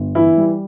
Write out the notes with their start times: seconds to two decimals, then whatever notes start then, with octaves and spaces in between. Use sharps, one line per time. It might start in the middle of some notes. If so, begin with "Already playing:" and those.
Already playing: G1
0.15 E3 E4
0.37 G3